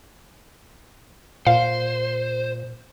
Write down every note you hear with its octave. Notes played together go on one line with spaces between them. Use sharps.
A#2 C5 F5